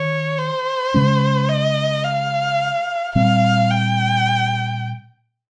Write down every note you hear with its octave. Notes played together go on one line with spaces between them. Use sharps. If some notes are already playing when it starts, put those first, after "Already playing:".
Already playing: D#3 C#5
C5
C#3 G#3 C#4
D#5
F5
A#2 G3 C4 F5
G5